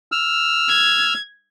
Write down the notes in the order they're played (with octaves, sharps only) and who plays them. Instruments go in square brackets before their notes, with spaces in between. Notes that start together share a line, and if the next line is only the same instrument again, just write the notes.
[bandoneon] E6 F6
[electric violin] G#6